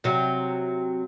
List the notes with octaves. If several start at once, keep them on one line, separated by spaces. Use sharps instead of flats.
C3 F#3